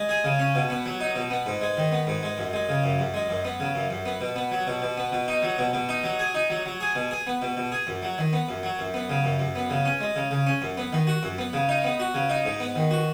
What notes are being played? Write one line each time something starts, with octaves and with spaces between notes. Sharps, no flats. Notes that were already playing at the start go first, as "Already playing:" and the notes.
Already playing: G#3
G#4
C#3
C#4
B2
B3
F#3
D#4
B2
B3
G#2
G#3
D#3
B3
G#2
G#3
F#2
G#3
C#3
F#2
F#2
G#3
F#2
B3
C#3
F#2
F#2
B3
B2
B3
F#3
B2
B2
B3
B2
D#4
F#3
B2
B2
D#4
F#3
G#4
D#4
F#3
F#3
G#4
B2
G#4
B3
B2
B2
G#4
F#2
F#3
D#3
B3
F#2
F#3
F#2
B3
C#3
F#2
F#2
B3
C#3
C#4
G#3
C#3
C#3
C#4
F#2
B3
D#3
F#4
F#2
B3
C#3
D#4
B3
F#4
C#3
D#4
G#2
B3
D#3
F#4